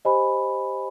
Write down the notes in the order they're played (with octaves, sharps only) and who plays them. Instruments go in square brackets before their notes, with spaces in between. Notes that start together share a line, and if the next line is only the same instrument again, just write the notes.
[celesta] G4 C5 D#5 G#5 B5